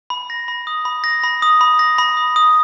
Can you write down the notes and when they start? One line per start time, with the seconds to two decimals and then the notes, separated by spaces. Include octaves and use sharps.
0.10 B5
0.30 A#6
0.48 B5
0.67 D#6
0.85 B5
1.04 A#6
1.24 B5
1.42 D#6
1.61 B5
1.79 A#6
1.98 B5
2.17 D#6
2.36 D#6